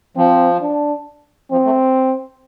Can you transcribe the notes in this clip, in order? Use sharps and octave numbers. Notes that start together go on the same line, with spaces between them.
F3 C4
D4
F3 C4
A3